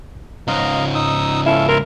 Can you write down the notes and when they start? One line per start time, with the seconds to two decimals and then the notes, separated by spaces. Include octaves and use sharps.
0.48 C#2 G#2 D#5 F5 A#5
0.95 D#4 D#6 E6
1.46 C#4 E4 A4 F5
1.69 E4 A#4 E5 C6